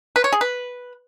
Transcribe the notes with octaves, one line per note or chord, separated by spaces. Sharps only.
B4
C#5
G#4
B4